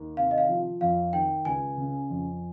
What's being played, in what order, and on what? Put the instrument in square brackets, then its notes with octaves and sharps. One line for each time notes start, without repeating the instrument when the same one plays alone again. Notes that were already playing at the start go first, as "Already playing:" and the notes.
Already playing: [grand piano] D#2 D#3
[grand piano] C3 [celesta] F5
[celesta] D#5
F5
[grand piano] F3
[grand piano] F2 [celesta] F5
[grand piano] D#3 [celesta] G5
[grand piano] C#2 [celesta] G#5
[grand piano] C#3
F2